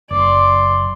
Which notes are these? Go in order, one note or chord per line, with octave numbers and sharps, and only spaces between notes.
F#1 D5 C6